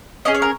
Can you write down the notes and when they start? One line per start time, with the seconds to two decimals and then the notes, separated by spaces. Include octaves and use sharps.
0.25 C#4 G#4 D#5
0.34 C#5
0.42 A#4